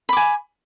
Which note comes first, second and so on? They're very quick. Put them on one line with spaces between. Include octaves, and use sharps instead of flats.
B5 D6 G#5